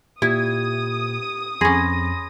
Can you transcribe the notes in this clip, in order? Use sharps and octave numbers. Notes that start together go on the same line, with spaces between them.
A#2 E4 G4 D#6 G#6
F2 C#4 G#4 B5 C6 A#6